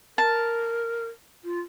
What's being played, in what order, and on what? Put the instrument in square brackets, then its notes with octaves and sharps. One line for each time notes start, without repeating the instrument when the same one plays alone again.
[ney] A#4 [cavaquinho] A5
[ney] F4